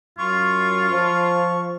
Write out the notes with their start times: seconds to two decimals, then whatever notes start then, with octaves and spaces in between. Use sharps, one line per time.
0.19 F#2 F4 C#6
0.90 F3